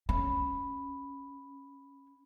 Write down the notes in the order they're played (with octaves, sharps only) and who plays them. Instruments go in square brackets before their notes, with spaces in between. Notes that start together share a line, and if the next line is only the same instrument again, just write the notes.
[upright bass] C#4 [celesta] B5